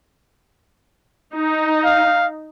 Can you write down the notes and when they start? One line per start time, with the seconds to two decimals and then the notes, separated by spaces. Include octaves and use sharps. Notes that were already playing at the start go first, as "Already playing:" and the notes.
1.34 D#4
1.84 F5